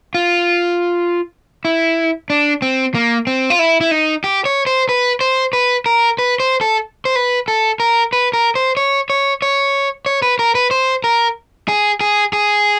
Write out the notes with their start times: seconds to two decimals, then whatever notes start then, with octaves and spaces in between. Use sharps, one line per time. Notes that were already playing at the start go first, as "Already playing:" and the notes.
0.15 F4
1.65 E4
2.30 D4
2.62 C4
2.95 A#3
3.27 C4
3.50 F4
3.59 E4
3.81 E4
3.91 D#4
4.24 G4
4.45 C#5
4.67 C5
4.89 B4
5.21 C5
5.53 B4
5.86 A#4
6.19 B4
6.40 C5
6.61 A4
7.05 C5
7.16 B4
7.48 A4
7.80 A#4
8.13 B4
8.33 A#4
8.55 C5
8.77 C#5
9.10 C#5
9.42 C#5
10.06 C#5
10.22 B4
10.39 A#4
10.55 B4
10.71 C5
11.04 A#4
11.68 G#4
12.01 G#4
12.33 G#4